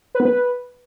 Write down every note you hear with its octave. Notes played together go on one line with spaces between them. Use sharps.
B4
B3
B4